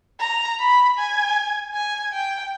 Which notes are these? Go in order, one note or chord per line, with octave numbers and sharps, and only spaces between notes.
A#5
B5
G#5
G#5
G5